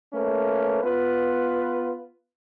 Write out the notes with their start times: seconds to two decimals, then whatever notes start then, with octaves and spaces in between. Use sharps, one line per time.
0.13 A3 A#3 C#4 B4
0.83 B3 F4 B4